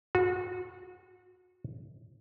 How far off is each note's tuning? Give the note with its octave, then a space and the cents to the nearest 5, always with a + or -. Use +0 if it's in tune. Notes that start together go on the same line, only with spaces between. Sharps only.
F#4 -30